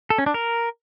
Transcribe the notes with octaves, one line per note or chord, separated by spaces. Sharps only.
A4
C#4
D4
A#4